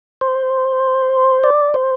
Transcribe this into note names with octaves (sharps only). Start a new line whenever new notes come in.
C5
D5
C5